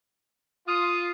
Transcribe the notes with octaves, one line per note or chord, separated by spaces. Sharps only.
F4 D#6